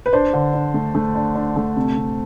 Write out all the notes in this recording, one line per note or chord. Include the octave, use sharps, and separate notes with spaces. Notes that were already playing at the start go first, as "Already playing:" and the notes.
B4
D4 C5
D3
D4
A3
A3
D4
D4
A3
C3
C3